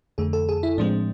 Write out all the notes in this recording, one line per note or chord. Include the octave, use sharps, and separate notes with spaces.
F2 D3 A3 G#4
A4
G#4
E4
A2 F3 G#3 C4 D4